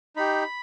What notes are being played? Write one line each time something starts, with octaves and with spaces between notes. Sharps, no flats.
D#4 G4 B5